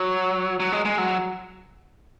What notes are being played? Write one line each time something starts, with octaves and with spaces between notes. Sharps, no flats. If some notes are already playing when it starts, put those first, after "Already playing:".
Already playing: F#3
F#3
G#3
G#3
F#3